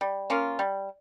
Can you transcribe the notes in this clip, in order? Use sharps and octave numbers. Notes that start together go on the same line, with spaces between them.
G3
A#3 C#4 F4
G3